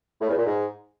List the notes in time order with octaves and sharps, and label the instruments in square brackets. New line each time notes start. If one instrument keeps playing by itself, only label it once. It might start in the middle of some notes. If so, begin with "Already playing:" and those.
[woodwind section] A2
E2
A#2
G#2